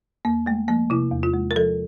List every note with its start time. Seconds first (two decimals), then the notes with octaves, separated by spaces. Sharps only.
0.25 E2 A#3
0.46 G#3 A3
0.68 F3 A#3
0.90 C3 E4
1.12 E2
1.23 F4
1.34 G#3
1.51 A#4
1.56 F3 A4